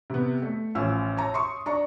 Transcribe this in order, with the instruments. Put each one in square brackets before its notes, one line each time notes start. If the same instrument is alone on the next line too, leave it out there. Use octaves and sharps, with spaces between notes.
[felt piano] C3 B3
A3
A1 F3 C#4 E6
C#5 A5 A#5
C6 C#6 D#6
D4 A#5 C#6